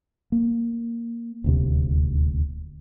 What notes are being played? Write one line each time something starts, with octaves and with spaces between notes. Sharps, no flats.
A#3
D#1 D2 C3